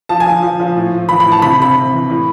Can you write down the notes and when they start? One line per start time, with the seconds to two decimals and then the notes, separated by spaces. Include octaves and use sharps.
0.09 F3 A5
0.20 G#5
0.26 F3
0.43 F3
0.60 F3
0.77 A2
0.92 A2
1.09 E3 B5
1.20 B5
1.26 A2
1.32 A5
1.42 C3 B5
1.59 C3 B5
1.76 C3
1.93 E3
2.10 A2